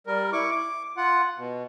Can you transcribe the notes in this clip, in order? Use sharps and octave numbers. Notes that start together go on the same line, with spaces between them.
G3 A#4
E4 C#6 D6
D6
F4 F#5
B2